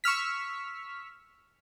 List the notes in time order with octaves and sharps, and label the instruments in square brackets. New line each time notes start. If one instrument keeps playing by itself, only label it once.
[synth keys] C#6 E6 F6 B6